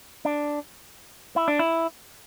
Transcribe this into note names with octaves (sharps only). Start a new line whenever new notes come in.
D4
E4
D4
E4